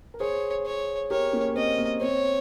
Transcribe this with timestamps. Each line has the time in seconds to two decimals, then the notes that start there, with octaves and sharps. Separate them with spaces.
0.14 A#4
0.20 G#4 C5 C#5
0.66 C#5
1.10 G4 A#4 C#5
1.33 A#3 C#4
1.56 C4 D#5
1.78 A#3
2.01 C4 C#5